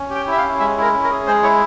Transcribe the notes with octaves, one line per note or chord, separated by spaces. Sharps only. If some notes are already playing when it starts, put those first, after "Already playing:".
Already playing: C#4
G4
G5
E4 E5
F5
C#4
G#3 E5
E4 A#4
C#4
A#4
G#4
G#3 C5
E4 C#5